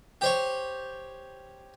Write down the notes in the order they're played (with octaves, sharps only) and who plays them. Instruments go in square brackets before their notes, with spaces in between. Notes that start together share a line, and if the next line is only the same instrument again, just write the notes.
[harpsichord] G4 C5 C#5